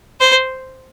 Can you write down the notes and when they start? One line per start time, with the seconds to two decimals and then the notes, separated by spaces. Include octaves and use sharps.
0.20 C5